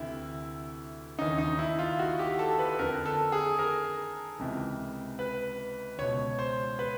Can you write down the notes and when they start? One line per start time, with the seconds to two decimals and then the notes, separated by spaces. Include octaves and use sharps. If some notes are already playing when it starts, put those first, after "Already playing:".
Already playing: D2 C3 E3 E4
1.19 D#2 C#3 E3 D#4
1.38 D#4
1.59 E4
1.79 F4
1.99 F#4
2.19 G4
2.39 A4
2.59 B4
2.79 F2 D3 A#4
3.05 A4
3.32 G#4
3.59 A#4
4.39 C#2 C3 E3
5.19 B4
5.98 C#2 B2 C#5
6.39 C5
6.79 B4